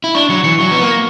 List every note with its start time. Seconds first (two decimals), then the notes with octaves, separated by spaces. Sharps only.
0.04 E4
0.15 D4 C#6
0.30 F#3 C#7
0.44 E3 C#7
0.59 F#3 C#6
0.71 B3 C#7
0.82 A#3
0.89 A#6